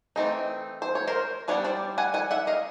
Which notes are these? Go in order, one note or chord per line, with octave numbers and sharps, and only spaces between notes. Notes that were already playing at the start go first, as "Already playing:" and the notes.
E3 A3 C4 D#4
C5
C#5
A#4 C5
G3 B3 D4 B4 C#5
C5 D5
F#5 G#5
F#5 G#5
E5 F#5
D#5 F5